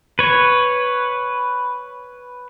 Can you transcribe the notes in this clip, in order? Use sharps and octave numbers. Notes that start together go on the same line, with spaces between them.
B4 C#5